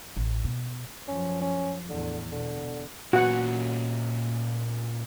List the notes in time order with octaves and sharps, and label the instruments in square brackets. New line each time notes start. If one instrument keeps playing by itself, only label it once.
[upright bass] A1
B2
[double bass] F#2 F3 [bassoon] C#4
[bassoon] C#4
[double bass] E2 A2 [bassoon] D3
[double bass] B2 [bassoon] D3
[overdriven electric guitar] A#2 C#4 [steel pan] F#4 F#5